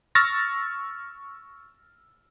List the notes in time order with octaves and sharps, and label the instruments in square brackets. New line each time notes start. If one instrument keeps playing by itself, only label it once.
[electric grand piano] C#6 E6 F6 A6 A#6